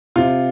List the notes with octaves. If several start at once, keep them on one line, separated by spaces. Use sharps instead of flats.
C3 F4